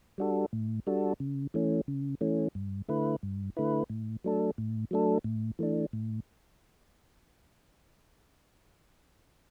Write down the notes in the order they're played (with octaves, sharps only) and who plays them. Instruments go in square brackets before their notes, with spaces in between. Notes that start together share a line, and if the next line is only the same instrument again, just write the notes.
[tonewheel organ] G3 D4 F#4 A4
A2
G3 D4 F#4 A4
C#3
E3 A3 C#4
C#3
E3 A3 C#4
G2
D3 A3 E4 B4
G2
D3 A3 E4 B4
A2
F#3 A3 D4 A4
A2
F#3 A3 D4 A4
A2
E3 A3 D4
A2